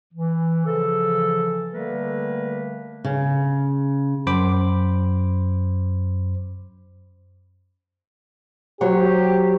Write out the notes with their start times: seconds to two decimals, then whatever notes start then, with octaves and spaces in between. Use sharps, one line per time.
0.14 E3
0.65 C#3 E3 F3 A4
1.73 D3 G3 A3 A#3 A#4 B4
3.05 C#3
4.27 F#2 C5 B5 D6
8.81 F#3 G4 C5 C#5